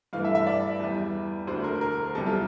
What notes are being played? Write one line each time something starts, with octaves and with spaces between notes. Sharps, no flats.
G2 E3 A3 F5
E5
E5
D5
E2 E3 G3
D2 D3 A3 C5
A#4
A#4
E2 C3 G3 A4
F4